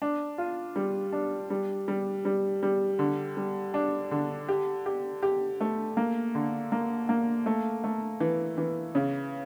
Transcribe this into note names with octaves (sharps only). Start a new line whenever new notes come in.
D4
F4
G3
D4
G3
G3
G3
G3
D3
G3
D4
D3
G4
G4
G4
A3
A#3
D3
A#3
A#3
A3
A3
E3
E3
C#3